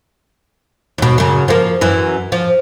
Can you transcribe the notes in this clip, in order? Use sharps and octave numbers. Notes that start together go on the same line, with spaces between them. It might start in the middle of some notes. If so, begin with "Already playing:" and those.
D#2 B2
F#2 C#3
F3 A#3
F#2 E3
F3